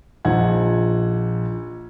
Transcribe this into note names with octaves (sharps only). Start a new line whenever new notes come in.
A#1 F3 D#4 F#5 G#6